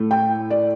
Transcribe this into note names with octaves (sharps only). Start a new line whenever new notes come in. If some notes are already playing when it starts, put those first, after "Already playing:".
Already playing: A2 A3
G5
D5